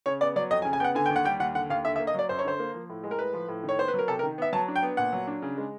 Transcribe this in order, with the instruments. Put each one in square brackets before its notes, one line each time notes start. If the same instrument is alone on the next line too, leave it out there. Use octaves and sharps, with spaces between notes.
[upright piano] C#3 C#5
B3 D5
F#3 D5
F2 D#5
G#5
C#3
G#5
B3 F#5 G5
D3 G#5
D#2 G5
F#5
G3 G5
D#2 F#5
D3 F#5
D#2 F5
D3 E5
E5
A#3
D#5
F#3 D5
F#2 C5
C#5
D3 C5
A#3
F3
A2
G#3
A#4
A2 B4
F3
A2
D#3
C#5
B3 C5
B4
F#3
A#4
C3 A4
A#4
D#3
B3 E5
F#3 A5
D4
G5
B3
A#2 F#5
F#3
D4
C#3
G#3